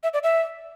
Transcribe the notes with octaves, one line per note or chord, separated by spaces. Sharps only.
E5
D5
E5